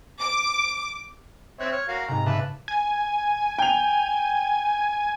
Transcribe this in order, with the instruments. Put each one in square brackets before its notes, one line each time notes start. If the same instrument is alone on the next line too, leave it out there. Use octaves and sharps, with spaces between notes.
[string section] D6
[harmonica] C4 C#5 E5 [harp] F#6
[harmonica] C#5 [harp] F6
[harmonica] F#4 A#4 F5
[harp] G#2 C3 [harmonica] A#5
[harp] C#3 D6 E7 [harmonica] B4 E5 A5
[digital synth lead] G#5
[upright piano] G5 F7